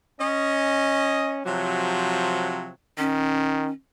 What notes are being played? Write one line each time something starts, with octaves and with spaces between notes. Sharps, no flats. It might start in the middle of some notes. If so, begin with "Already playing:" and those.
C#4 D#5
C3 F3 F#3
D#3 C#4